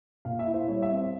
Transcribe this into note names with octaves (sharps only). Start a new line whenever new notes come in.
A#2 F5
E5
E4
C5
G3 C#5
E5
C4
C5